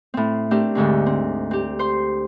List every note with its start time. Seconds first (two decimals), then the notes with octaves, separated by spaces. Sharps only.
0.14 A2 C4
0.51 A3 C4 D4 G4 A#4
0.75 D2 G#2 D3 C4
1.06 C4
1.51 C4 G4
1.79 C5 C6